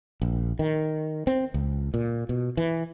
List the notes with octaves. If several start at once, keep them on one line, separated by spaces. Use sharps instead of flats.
A#1
D#3
C4
C#2
A#2
B2
E3